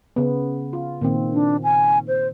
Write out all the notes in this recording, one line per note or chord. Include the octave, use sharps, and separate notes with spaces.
C#3 B3
F4
A#2 D#3 C4
D4
G#5
C5